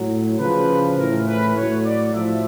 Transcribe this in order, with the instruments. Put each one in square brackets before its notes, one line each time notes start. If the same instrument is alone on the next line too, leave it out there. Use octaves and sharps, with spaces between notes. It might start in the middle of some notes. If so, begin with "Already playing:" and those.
Already playing: [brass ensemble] A2 F#3
C#3 F3 B4
A2 E3 A#4
B4
A2 F#3 C#5
D5
A2 F3 E5